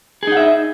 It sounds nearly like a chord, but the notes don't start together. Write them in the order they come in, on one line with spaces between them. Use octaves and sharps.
G#4 D#4 F#5 E5 D#5